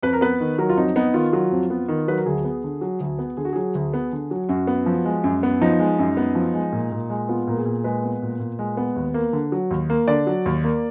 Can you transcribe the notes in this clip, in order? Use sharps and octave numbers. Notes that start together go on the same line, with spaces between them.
F2 B4
A#4
B3 B4
D#3
F#3 A#4
F4
F2 D#4
B3 D#4
D#3 F4
F#3
F2
B3
D#3
F#3 B4
A#4
D2 G#4
B3
D3
F#3
D2
B3
D3 G#4
F#4
F#3 G#4
D2
B3
D3
F#3
F#2 F#4
B3
F3
G#3
F#2
B3
F3 D#4
G#3
F#2
B3
F3
G#3
A#2
A#2
G#3
B3 F4
A#2 A#4
G#4
A#2
G#3 B4
B3
A#2
A#2
G#3
B3
D#2
A#3
D3
F#3
D#2
A#3
D3 D5
F#3
D#2
A#3